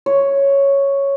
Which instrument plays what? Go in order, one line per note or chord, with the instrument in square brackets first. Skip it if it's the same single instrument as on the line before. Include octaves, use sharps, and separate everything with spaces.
[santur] C#5